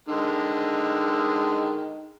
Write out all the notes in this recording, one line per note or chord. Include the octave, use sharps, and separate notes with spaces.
D3 D#3 G#3